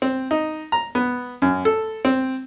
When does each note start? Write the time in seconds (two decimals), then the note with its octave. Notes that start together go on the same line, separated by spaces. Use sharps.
0.02 C4
0.31 D#4
0.72 A#5
0.95 B3
1.42 F#2
1.65 A4
2.05 C4